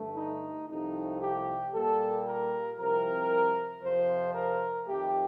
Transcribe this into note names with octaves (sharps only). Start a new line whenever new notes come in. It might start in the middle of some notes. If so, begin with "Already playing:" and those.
Already playing: G2 D3 A3
D#4
C2 C3 F3 A3 D#4
G4
A#2 G3 A#3 A4
A#4
C2 C3 F3 A#4
F2 C3 F3 C5
A#4
F2 D#3 A3 G4